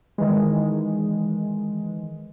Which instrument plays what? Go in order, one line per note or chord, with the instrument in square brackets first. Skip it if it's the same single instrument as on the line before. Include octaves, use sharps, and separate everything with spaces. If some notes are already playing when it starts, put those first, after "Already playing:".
[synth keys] D#3 E3 G#3